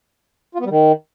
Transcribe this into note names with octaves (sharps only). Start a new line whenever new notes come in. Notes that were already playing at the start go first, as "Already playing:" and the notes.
F4
B3
G3
D#3